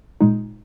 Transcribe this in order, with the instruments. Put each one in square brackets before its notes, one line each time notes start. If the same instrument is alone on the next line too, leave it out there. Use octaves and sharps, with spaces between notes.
[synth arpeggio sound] A#2 G#3 D#4